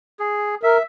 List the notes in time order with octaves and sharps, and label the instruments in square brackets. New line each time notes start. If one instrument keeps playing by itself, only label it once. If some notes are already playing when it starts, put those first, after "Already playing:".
[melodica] G#4
[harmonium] A#4 [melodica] E5